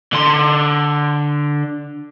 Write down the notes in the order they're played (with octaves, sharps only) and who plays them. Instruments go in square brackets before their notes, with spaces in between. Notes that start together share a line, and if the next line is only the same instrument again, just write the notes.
[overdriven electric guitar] D3 C6